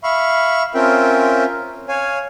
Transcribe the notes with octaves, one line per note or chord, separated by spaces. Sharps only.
E5 F5 B5 C#6
C4 C#4 F4 A#4 E5 G5
C#5 F5 G#5